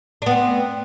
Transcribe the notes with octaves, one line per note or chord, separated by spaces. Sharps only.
B3 C4 D4